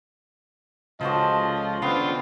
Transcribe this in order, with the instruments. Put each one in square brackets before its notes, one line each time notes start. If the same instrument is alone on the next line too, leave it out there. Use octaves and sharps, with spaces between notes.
[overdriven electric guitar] C#2 [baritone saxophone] F3 [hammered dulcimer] F#4 A4 C5 [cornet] D#5
[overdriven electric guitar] C#3 D4 [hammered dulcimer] B3 [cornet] C4 [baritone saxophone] F4